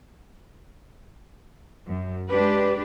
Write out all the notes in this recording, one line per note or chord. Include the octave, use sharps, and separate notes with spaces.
F#2
G#3 D4 G4 B4